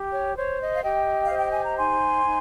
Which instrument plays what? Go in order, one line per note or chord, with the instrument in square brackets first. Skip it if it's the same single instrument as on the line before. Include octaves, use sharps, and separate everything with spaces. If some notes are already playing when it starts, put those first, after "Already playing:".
Already playing: [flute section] G4
C#5
C5 C#5
D#5
F5
G4 D#5 G5
F5
C5
G5
G#5
A#5
D#4 G#5 C6
D#4